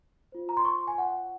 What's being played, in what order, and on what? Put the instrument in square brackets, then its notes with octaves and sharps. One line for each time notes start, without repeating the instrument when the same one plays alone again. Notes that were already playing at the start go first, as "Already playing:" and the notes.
[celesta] F4 C5
A#5
C6
C#6
G#5
F#5